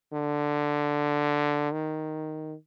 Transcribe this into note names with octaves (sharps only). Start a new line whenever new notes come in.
D3
D#3